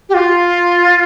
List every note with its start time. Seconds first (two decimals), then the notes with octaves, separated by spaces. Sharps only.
0.09 G4
0.14 F4